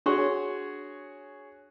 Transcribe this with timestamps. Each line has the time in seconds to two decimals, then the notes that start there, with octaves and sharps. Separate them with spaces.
0.06 D4 F#4 G#4 C#5 C6 C#6